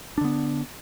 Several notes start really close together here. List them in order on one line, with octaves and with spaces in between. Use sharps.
D4 D3 B3